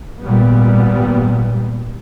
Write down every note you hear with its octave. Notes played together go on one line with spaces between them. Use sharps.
G#1 A#2 G3 B3